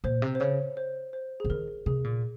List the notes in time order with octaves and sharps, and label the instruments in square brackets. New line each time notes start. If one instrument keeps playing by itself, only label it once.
[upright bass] A#2 [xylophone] C5
[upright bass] C3
[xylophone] C5
[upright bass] C#3 [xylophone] C#5
[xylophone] C5
C5
[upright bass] C#3 [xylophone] G#4
[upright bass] D#3 [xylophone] A#4
[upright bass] C3 [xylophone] G#4
[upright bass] A#2